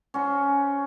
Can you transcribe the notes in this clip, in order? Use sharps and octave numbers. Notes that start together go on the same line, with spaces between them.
C#4 F#4 C5